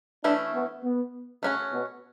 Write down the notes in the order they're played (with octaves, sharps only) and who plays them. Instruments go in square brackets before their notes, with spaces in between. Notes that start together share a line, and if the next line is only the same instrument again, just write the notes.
[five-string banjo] E3 A3 C#4 E4 [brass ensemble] D4
[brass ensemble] B3
B3
[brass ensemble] C#3 [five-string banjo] A3 C#4 F#4 C#5
[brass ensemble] B2